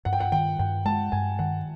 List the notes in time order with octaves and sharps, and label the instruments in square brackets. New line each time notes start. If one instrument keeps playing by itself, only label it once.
[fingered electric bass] G2 [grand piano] F#5
[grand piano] G5
F#5
[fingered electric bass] D#3 [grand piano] G5
[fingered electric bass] G2 [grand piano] G5
[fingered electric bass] G#3 [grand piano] A5
[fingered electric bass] G2 [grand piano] G#5
[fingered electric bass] D#3 [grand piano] F#5